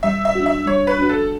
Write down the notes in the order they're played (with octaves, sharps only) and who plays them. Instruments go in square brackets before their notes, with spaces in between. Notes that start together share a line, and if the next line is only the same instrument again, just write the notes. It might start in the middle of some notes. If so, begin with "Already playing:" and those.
[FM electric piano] G3 [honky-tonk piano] E5
[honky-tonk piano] E5
[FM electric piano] D4 F#4
[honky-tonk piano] E5
[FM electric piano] G3 [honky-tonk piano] C#5
[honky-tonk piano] B4
[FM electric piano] D4 F#4
[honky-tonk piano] A4